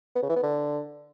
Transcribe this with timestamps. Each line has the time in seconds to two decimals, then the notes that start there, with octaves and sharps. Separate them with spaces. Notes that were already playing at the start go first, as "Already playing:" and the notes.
0.15 B3
0.22 C#3
0.29 E3
0.36 B3
0.43 D3